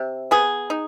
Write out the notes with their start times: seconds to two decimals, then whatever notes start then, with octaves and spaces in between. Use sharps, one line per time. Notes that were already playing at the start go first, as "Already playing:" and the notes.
Already playing: C3
0.31 B3 G#4
0.70 D#4